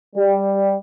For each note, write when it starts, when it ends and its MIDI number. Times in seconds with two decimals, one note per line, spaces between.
0.16 0.74 55